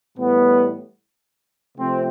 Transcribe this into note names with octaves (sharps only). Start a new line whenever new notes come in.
A2 E3 G3 B3
C3 F3 A3 C4